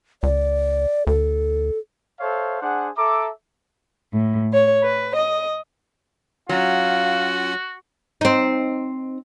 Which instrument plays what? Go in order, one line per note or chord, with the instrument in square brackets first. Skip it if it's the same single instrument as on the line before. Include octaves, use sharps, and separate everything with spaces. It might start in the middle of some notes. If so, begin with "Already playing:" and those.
[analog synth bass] C#2 [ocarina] D5
[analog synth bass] D2 [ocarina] A4
[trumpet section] A4 C5 C#5 E5 F5
D4 G#4 C5 F#5
A4 E5 A#5 D6
[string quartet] A2
C#5
B4
D#5
[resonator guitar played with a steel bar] F#3 [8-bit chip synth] C#4 F4 F#5 [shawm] F#4 [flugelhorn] F5
[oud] C4 D#4